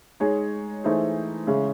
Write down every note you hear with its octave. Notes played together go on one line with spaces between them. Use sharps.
G#3 D#4 G#4 C#5
E3 A3 D#4 G#4 C5
C#3 G#3 C#4 E4